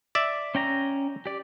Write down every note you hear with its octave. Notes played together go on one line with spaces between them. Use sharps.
D5 E5
C#4 G5 A#5
G4 D5